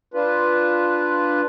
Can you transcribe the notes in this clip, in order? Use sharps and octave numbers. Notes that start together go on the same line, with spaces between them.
D4 F4 B4